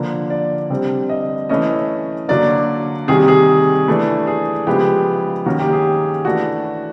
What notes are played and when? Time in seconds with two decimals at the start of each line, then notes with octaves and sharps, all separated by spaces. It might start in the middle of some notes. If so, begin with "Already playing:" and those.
Already playing: D3 F3 A#3
0.30 D5
0.70 D3 G3 C4
1.09 D#5
1.49 E3 A3 C#4 D#5
2.28 D3 F#3 A#3 D5
3.08 C3 D#3 G3 G#4
3.28 G#4
3.88 E3 A3 D4
4.27 G#4
4.67 C#3 F3 G#3 B3 G4
5.46 D#3 F#3 A#3 C#4 F#4
5.59 G4
5.73 G#4
6.25 E3 A3 D4 F#4